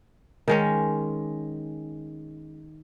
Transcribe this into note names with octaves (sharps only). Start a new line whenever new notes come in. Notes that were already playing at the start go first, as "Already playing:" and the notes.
D#3 G#3 C#4